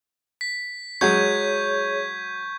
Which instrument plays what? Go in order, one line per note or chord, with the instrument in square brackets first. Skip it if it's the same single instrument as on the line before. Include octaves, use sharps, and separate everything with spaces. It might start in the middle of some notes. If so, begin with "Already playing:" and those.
[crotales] B6
[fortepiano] F#3 G#3 [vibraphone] G#4 C#5 [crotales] C#6 G6 G#6